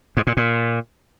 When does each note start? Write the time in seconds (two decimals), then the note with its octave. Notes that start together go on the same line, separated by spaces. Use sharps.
0.17 G#2
0.27 A#2
0.37 A#2